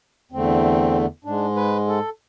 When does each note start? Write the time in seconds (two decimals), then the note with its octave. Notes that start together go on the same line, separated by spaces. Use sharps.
0.32 E2 D3 A3 C4
1.25 G#2 G#3 D4
1.56 B4
1.88 A4